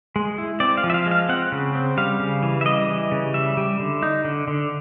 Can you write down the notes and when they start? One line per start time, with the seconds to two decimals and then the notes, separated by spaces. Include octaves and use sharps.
0.16 G#3
0.38 E4
0.60 C4 D5
0.77 F5
0.84 F3
0.90 E5
0.94 F5
1.06 G#3
1.11 F5
1.29 C4 F#5
1.52 C#3
1.75 C4
1.97 G3 F5
2.20 C#3
2.43 E3
2.61 E5
2.65 G3 D#5
2.88 E3
3.12 C#3
3.34 G3 E5
3.57 G3
3.79 D3
4.03 D#4
4.25 D3
4.48 D3